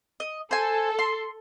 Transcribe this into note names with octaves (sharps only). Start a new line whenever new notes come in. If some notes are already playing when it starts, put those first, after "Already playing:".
D#5
A4 C5 G#5
C6